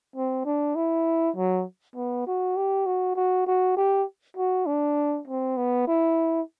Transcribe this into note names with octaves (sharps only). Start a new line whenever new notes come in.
C4
D4
E4
F#3
B3
F#4
G4
F#4
F#4
F#4
G4
F#4
D4
C4
B3
E4